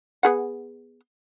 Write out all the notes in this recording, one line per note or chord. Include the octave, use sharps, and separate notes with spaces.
B3 G#4 F#5